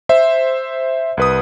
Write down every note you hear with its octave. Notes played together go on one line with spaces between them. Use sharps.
C5 E5
C2 B4 D#6